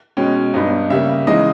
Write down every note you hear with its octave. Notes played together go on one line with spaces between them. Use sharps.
B2 G#3 C#4 G5
G2 G3 B3 D#4
C#3 G3 A#3 E5
C#3 E3 G#3 D#4 D#5